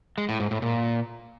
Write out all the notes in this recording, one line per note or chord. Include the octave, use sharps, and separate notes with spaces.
G#3
A2
G#2
A2
A#2